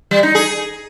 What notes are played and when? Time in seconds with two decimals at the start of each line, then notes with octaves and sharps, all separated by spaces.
0.11 G3
0.23 D#4
0.35 G#4